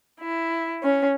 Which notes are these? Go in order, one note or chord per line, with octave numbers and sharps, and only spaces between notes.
E4
C#4